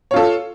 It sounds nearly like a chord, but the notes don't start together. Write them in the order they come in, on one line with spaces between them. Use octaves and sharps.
C#5 F4 A4